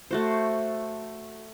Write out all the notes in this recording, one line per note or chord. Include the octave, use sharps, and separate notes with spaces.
A3 F#4 C5